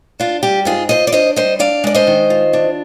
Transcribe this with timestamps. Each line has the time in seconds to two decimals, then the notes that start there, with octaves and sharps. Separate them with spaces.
0.20 D4 F4
0.43 G3 G4
0.65 G#2 F4 G#4
0.89 F4 C5 D#5
1.07 D5
1.12 D4 C5 D#5
1.36 G3 C5 D#5
1.59 D4 D5 F5
1.84 G#3 D5
1.95 C5 D#5
2.07 D#3
2.30 F4
2.53 D4